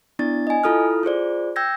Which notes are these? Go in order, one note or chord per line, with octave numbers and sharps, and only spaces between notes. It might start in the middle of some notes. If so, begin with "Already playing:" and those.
B3 D4 E4 D5 A6
D#5 G#5
E4 F4 A4 D#6 F6
F4 G#4 C5 D5
G5 E6 G6 G#6 A#6